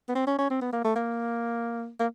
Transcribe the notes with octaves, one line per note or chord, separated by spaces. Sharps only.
B3
C4
C#4
C#4
C4
B3
A#3
A3
A#3
A#3